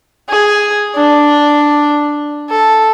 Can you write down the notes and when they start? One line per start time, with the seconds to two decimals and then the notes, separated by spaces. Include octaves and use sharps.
0.29 G#4
0.96 D4
2.50 A4